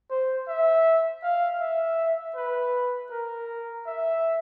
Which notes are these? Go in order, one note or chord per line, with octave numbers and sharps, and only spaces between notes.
C5
E5
F5
E5
B4
A#4
E5